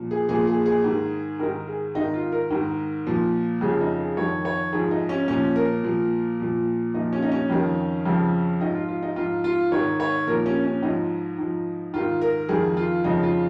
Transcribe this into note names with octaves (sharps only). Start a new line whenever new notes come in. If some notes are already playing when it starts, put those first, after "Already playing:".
Already playing: A#2 F3
G#4
A#2 F3 G#4
G#4
G#4
G#2 D#3
G#2 D#3 A#4
G#4
G#2 D#3 D#4
F4
A#4
G#2 D#3
A#2 F3
F2 C#3 F3 G#4
D#4
G#4
F2 D#3 C#5
C#5
G#2 F3 G#4
D#4
C#4
A#2 F3 C#4
A#4
A#2 F3
A#2 F3
A#2 F3 D#4
C#4
D#4
C#4
F2 D#3
F2 C#3 F3
G#2 F3 D#4
F4
F4
D#4
G#2 F3 F4
F4
G#2 D#3 C#5
C#5
A#2 F3 A#4
C#4
C#4
G#2 F3 D#4
G#2 F3
G#2 D#3 F4
A#4
F2 D#3 G#4
F4
F2 C#3 F3 D#4
F4